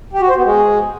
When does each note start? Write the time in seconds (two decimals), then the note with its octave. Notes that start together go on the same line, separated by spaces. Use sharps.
0.13 G4
0.21 F#4
0.29 C5
0.37 B3
0.45 G#3